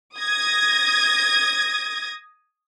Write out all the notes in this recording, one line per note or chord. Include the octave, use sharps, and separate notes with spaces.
D#6 G#6 A#6